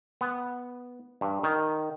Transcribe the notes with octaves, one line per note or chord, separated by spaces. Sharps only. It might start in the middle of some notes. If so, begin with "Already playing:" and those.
B3
G2
D#3